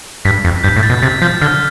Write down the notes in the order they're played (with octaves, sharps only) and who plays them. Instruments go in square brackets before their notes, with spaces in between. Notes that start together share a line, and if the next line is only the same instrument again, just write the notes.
[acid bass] G2 [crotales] B6
[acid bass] F2
[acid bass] G2 [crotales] G6
[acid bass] A2
[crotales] A6
[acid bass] B2
[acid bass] C3 [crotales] A6
[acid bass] F3 [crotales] G6
[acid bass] D3 [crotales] F6